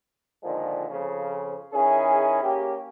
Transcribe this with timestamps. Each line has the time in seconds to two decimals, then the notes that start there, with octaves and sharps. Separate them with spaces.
0.43 A#2 D3 D#3 F3 G#3
0.88 F2 C#3 F3
1.72 D#3 C#4 E4 G#4
2.42 A#3 C#4 G4